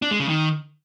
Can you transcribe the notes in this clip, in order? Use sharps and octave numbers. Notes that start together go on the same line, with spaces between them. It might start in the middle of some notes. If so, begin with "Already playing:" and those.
D4
G#3
C#3
D#3